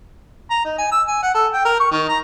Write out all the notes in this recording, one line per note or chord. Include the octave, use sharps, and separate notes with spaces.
A#5
D#4
G#5
E6
G#5
F#5
A4
G5
A#4
C#6
D#3
A#5